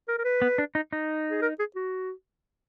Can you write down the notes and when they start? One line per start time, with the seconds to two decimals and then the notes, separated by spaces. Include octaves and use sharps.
0.09 A#4
0.19 A#4
0.24 B4
0.42 B3
0.58 D4
0.75 D#4
0.93 D#4
1.30 G#4
1.42 A#4
1.59 G#4
1.76 F#4